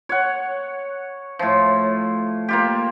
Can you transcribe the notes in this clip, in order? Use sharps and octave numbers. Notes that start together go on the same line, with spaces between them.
C#5 F#5
A2 F3
A#3 F4 G4